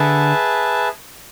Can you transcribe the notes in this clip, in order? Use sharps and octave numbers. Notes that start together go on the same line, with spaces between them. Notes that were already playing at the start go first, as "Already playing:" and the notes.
Already playing: D3 G#4 B4 E5 A5